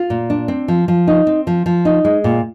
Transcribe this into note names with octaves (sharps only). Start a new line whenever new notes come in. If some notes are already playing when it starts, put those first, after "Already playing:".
Already playing: F4
A#2
D4
C4
F3
F3
D#4
C4
F3
F3
D#4
G#3
A#2